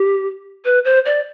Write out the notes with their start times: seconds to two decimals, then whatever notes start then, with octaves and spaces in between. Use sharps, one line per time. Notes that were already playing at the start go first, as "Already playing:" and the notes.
Already playing: G4
0.65 B4
0.85 C5
1.05 D5